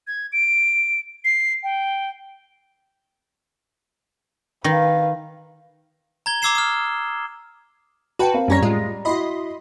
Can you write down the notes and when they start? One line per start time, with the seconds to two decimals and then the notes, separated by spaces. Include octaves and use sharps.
0.07 G#6
0.33 D7
1.25 C7
1.63 G5
4.64 D#3 B4 F5
6.26 A#5 G#6 G7
6.42 A#5 D6 E6 G#6 C7 E7
6.55 D#6 F6
8.19 F#4 B4 G5 A5
8.34 C4 A#4 F5
8.48 F#2 G3 C#4 C#5 A#5 A#6
8.62 A2 G#3 F4
9.05 E4 F#4 D#5 B5 C6